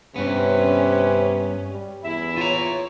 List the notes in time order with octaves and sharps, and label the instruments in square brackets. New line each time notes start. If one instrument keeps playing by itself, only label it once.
[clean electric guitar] G2 B3 [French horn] C3 [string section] C#4 [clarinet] B4
[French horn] G3
[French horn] E2 [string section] E4 [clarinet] E5
[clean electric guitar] F4 A#5 [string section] C#5